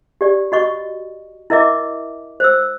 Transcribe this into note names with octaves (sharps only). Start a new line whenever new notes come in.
G4 D5
F#4 D#5 C#6
E4 A#4 D#5 E5 D6
C5 E6